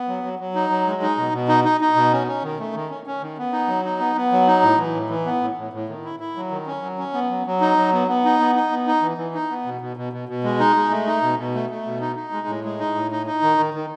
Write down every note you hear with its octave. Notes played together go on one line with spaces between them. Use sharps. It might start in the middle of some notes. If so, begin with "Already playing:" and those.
Already playing: B3
F#3
F#3
F#3
D#4
F#3
G#3
D#4
B2
B2
D#4
D#4
D#4
B2
C#4
C#4
D#3
A3
D#3
C#4
C#4
D#3
B3
D#4
F#3
D#4
B3
B3
F#3
D#4
A2
E3
A2
E3
B3
A2
A2
A2
D#3
E4
E4
F#3
D#3
C#4
F#3
C#4
B3
F#3
F#3
D#4
F#3
B3
B3
D#4
B3
D#4
B3
D#4
E3
E3
D#4
B3
B2
B2
B2
B2
B2
G#3
D#4
G#3
A3
D#4
B2
B2
A3
A3
B2
D#4
D#4
G#3
A2
G#3
D#4
A2
D#4
D#4
D#3
D#3
D#3